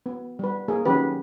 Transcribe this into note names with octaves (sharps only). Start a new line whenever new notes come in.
B3
G3 B4
A#3 G#4 A#4
D#3 F#3 C#4 G4 B4